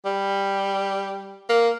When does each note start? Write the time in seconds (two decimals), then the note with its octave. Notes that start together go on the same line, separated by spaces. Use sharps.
0.05 G3
1.49 A#3